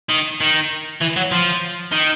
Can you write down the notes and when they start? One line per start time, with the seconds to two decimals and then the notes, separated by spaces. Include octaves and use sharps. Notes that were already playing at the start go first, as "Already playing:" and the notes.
0.09 D#3
0.41 D#3
1.01 E3
1.16 F#3
1.32 F3
1.92 D#3